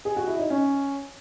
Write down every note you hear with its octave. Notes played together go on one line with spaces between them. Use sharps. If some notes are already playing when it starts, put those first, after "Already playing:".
G#4
F#4
E4
D#4
C#4